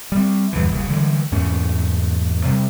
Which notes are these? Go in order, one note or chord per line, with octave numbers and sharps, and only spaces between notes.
G3 C4
E2 G2 D3 E3
F1 C#2 C#3 G3
D3 E3 G3 G#3
E2 G#2 A3 C#4
C3 G3